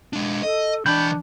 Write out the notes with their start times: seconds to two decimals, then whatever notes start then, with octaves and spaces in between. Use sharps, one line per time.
0.13 G#3 D4
0.43 A4 D#5
0.86 E3 D4 G5 B5 G6